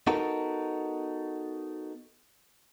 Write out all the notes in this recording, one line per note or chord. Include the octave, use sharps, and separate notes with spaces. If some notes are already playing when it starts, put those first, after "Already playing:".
B3 D#4 F#4 A4 A#4